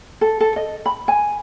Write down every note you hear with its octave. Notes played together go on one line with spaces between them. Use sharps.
A4
A4
D#5
B5
G#5